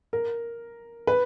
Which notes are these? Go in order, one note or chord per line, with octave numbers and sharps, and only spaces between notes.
A#4
B4